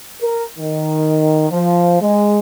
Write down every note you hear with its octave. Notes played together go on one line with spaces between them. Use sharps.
A#4
D#3
F3
G#3